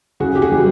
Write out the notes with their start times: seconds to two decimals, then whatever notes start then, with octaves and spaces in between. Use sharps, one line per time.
0.20 C#3 F#4 G#4
0.35 G4
0.42 F#4 G#4
0.52 E3 G3